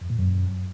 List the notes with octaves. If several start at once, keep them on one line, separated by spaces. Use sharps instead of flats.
F2
A#2
F#2